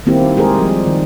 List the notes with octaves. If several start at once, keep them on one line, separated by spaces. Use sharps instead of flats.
D#3 G3 A#3 C4 E4 G4
G#3 G4 G#4 A#4 C5
F3 G3
D#3